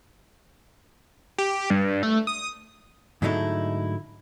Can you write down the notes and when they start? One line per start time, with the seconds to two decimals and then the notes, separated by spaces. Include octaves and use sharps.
1.38 G4
1.70 G2
2.03 A3
2.27 D#6
3.22 G#2 D3 F#3 A3 D#4 E4